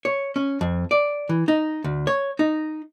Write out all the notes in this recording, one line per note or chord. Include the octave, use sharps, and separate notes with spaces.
C#5
C#4
F2
D5
E3
D#4
D2
C#5
D#4